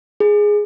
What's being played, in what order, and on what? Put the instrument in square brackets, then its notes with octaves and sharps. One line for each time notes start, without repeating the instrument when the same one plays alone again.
[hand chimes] G#4